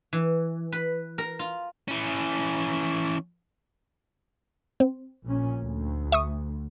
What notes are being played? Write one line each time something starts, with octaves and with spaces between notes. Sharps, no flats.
E3
B4
A#4
F4
E3 C#4
C4
A#1 A#2 C#4
D2
E5 C#6 D#6